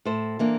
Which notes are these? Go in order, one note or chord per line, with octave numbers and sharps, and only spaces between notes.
A2 A4 C5
E3 A#3 D4